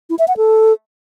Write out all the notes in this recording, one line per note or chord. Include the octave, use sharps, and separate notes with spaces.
E4
E5
F#5
A4